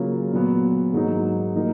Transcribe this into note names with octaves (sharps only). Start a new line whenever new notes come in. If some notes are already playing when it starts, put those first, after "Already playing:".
Already playing: C#3 F#3 A#3 F4
A#2 F#3 B3
G#2 F#3 A#3 D#4
F3 A#3 D#4 F#4